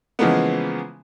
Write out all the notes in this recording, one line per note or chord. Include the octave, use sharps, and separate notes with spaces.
C#3 E3 F3 G#3 A#3 B3